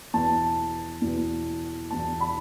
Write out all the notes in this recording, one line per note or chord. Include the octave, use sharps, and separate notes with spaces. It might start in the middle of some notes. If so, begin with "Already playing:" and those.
E2 B2 B3 A5
E2 B2 B3
E2 B2 B3 A5
B5